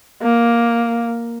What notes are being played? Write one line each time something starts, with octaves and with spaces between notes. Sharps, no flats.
A#3